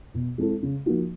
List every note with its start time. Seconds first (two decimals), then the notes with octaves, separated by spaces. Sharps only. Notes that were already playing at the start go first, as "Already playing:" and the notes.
0.14 B2
0.38 G#3 C4 E4 A4
0.63 C#3
0.86 F3 A#3 D#4 F#4